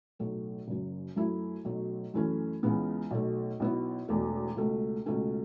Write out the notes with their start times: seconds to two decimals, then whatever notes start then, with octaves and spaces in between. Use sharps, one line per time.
0.19 B1 A2 F#3 A3
0.68 F#1 F#2 F#3
1.16 F#2 F#3 A3 E4
1.65 B1 B2 F#3 A3
2.14 F#2 E3 A3 C#4
2.63 C#2 C#3 E3 B3
3.11 B1 B2 A3
3.60 B1 B2 B3 E4
4.08 E1 E2 B2 A3
4.56 C#2 B2 A3
5.06 C#2 B2 A3 C#4